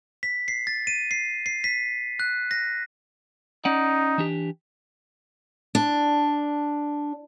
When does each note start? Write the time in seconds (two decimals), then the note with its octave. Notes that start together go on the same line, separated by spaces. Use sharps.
0.23 B6
0.48 C7
0.67 A6
0.87 D#7
1.11 C7
1.46 C7
1.64 B6
2.20 F#6
2.51 A#6
3.65 C#4 D#4 D5 F#5
4.18 E3 D4 G4
5.75 D4